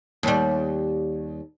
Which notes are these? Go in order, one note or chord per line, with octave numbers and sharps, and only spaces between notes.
D#2 G3